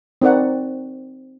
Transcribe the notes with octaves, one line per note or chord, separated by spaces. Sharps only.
C4 D#4 A#4 D5 F#5